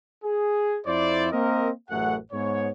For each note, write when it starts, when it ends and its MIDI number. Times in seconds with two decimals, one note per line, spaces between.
0.24 0.78 68
0.86 1.28 41
0.86 1.28 64
0.86 1.28 72
0.86 1.28 74
1.32 1.70 58
1.32 1.70 60
1.32 1.70 70
1.32 1.70 75
1.90 2.17 33
1.90 2.17 42
1.90 2.17 57
1.90 2.17 68
1.90 2.17 78
2.32 2.70 44
2.32 2.70 59
2.32 2.70 73